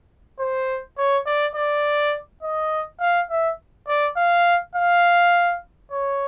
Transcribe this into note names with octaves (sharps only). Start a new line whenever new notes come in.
C5
C#5
D5
D5
D#5
F5
E5
D5
F5
F5
C#5